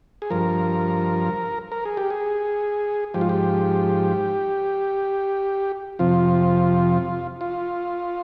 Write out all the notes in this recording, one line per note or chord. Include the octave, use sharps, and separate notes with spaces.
G#4
G2 F3 A#4
A#4
G#4
G4
G#4
G#2 F3 G4
F4
G4
F2 C3 F3 F4
F4